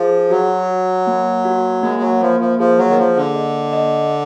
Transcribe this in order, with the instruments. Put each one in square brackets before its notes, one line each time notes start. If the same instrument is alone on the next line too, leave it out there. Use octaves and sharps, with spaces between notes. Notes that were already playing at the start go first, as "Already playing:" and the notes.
Already playing: [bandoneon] F3 [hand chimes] G#4
[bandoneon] F#3 [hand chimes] F#4
[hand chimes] F#4
A#3
F#4
[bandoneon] G#3 [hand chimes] A#3
[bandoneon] F#3
[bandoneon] F3 [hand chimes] A#3
[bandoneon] F3
[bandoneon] F3 [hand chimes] G#4
[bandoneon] F#3
D#3
[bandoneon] F3 [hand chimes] A#3
[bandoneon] D3
[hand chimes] D#5
D#5